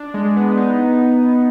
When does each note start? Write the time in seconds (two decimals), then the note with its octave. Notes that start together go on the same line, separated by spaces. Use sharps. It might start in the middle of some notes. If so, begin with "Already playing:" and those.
Already playing: D4
0.14 G#3
0.36 B3
0.57 D#4